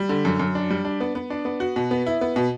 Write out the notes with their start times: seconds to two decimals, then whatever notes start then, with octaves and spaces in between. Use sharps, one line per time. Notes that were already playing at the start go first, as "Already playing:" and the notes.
Already playing: G3
0.09 D3
0.25 F#2
0.40 F#2
0.55 D4
0.70 G3
0.85 D4
1.00 B3
1.15 B3
1.30 D4
1.45 B3
1.60 F#4
1.76 B2
1.91 B3
2.07 E4
2.21 B3
2.36 B2